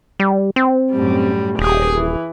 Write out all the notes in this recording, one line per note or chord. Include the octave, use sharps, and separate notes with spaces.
G3
C4
F#2 A2 G3
D#1 G4 G#4 D#6
E3